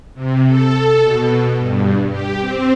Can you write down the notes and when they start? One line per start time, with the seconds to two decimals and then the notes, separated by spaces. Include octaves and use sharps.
0.14 C3
0.47 A4
1.02 B2
1.57 G2
2.09 G4
2.40 C4